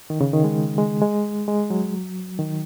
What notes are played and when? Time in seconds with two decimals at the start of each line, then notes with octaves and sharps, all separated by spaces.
0.10 D#3
0.21 C#3
0.33 D#3
0.44 G#3
0.78 G#3
1.01 G#3
1.48 G#3
1.70 F#3
2.39 D#3